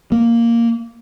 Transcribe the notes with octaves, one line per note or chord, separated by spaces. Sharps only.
A#3